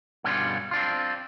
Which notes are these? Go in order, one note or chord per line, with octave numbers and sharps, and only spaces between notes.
G2 B2 D3 G3 C#4 F4
C4 D4 F4